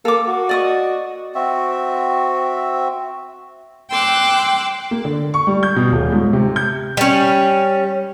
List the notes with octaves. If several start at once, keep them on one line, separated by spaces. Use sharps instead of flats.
A#3 A4 D6
F#4
D5 D#5 C#6
C4 F#4 E5
G5 C6 D6 E6 F#6
A#3
D3
C#6
G3
G6
B2
D#1
G#2
C3
G6
G3 C#4